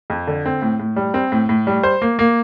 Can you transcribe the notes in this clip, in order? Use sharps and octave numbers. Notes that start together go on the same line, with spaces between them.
F2
D3
C4
A2
A2
G3
C4
A2
A2
G3
C5
A#3
A#3